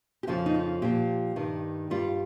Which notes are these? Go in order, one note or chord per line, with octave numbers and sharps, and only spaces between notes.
G4
F2 C#3 F3 F4
D#4
F4
A#2 F3 G4
G2 D#3 G3
G2 G3 F4